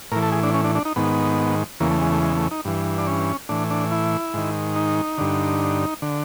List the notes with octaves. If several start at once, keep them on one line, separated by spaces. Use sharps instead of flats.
A2 E3 A#4
A4
G#4
D4
C#4
D4
D4
D#4
G#2 D#3 B3
E2 C#3 E3 A#3
A3
G#3
A3
G#3
A3
D#4
G2 E3
D4
C#4
A2 E3 D4
D4
E4
G#2 D#3
D#4
G2 D3
D3